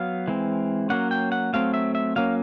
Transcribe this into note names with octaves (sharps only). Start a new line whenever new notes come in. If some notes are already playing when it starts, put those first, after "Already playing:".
Already playing: F#3 B3 F5
E3 G#3 C4
F#3 A#3 C#4 F#5
G5
F#5
F#3 A3 C4 F5
E5
E5
F#3 A#3 C#4 F5